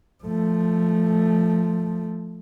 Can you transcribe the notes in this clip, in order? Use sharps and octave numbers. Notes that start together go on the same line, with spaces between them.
F3 A3